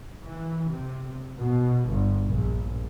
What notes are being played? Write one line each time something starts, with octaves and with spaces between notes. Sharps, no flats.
E3
C3
B2
G1
A#1